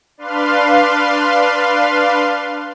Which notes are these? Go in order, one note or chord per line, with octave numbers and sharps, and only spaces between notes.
D4 B4 F5 C6